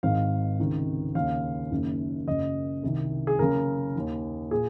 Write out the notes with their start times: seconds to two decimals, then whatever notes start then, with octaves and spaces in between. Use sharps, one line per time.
0.03 G#1 G#2 D#3 F5
0.59 C#2 C3 D#3
1.15 D#2 C#3 F5
1.71 F#1 F#2 D#3
2.27 F#1 F#2 C#3 D#5
2.83 C2 C3 D#3
3.27 G#4
3.39 F#1 F#2 C#3 A#4
3.95 D#2 D#3
4.51 A#2 G#4